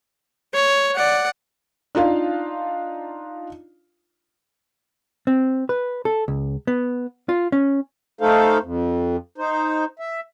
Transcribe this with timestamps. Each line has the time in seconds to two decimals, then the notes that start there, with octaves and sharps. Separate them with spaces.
0.54 C#5
0.95 D5 F#5
1.95 D4 D#4 F4 F5
5.27 C4
5.69 B4
6.05 A4
6.28 C#2
6.67 B3
7.29 F4
7.52 C#4
8.21 A3 D#4 A4 C5 F5
8.63 F2
9.38 D#4 C5
9.99 E5